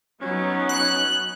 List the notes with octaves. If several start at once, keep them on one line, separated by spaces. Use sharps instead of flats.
F#3 B3 C#4 D#4
F#6